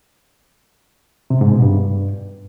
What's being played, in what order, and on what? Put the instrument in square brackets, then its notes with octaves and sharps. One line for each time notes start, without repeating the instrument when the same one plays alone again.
[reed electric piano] C3
G#2
B2
G2